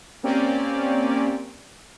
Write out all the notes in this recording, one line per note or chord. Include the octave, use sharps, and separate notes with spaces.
A#3 C4 C#4 G4 D5